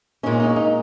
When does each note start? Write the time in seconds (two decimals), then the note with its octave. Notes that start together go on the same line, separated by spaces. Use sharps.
0.23 A#2 G#3 C#4 D#4
0.40 D#4
0.49 C#4
0.56 D#4